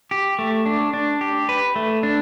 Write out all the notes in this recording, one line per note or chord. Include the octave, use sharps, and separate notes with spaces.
G4
A3
D4
D4
G4
B4
A3
D4